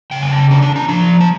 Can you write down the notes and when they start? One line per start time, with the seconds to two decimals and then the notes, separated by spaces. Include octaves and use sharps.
0.11 C#3 G5
0.22 G#5
0.31 A5
0.51 D4 A#5
0.62 A5
0.76 A#5
0.88 F3 A#5
1.21 A5